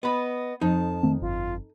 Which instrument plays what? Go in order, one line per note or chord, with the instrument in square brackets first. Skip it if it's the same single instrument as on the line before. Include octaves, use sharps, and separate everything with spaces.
[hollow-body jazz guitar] B3 B5 [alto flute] D#5
[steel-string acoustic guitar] F2 [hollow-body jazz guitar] D#4 [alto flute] A5
[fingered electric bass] D#3 A3 C4
[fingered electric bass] G1 [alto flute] F4